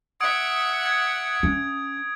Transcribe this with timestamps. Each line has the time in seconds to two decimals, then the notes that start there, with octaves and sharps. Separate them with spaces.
0.21 E5 F#5 D#6 G#6 D7
0.86 G#6
1.43 C#4